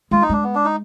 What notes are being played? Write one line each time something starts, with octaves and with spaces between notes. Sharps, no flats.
G#3 F4
D#4
G#3 D4
B3
D4
D#4